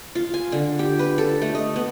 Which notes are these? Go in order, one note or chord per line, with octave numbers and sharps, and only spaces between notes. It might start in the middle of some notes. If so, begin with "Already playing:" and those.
F4
G#5
D3
G4
B4
A4
A3
D#5
B3